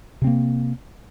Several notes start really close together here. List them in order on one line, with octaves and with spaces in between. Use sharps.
C3 C4 A#3